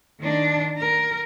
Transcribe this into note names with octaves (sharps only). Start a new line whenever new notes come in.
D#3 D4
A#4